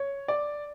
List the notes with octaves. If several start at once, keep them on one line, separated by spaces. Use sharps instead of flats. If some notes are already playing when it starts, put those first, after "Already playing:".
Already playing: C#5
D5